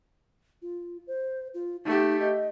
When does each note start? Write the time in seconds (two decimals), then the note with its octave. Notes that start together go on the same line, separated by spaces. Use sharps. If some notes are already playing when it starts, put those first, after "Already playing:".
0.62 F4
1.07 C5
1.54 F4
1.85 A3 D#4 G4
2.20 D#5